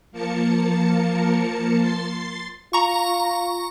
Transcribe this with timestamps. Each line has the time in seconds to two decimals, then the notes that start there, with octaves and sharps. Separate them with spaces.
0.12 F3 A#3 A#4 A5 C#7
1.79 C6 A6 C7
2.73 F4 A#5 C#6